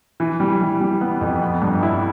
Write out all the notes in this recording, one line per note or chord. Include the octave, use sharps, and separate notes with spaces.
E3
G3
E3
G3
B3
F2
B3
G2
E4